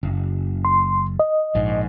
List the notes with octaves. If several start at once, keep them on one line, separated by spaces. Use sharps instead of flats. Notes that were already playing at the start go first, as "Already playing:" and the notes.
F#1
C6
D#5
A#1 G#2